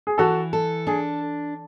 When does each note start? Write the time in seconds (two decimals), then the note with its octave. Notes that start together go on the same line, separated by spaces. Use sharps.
0.07 G#4
0.18 E3 F#4 A4
0.53 A4
0.87 D4 G#4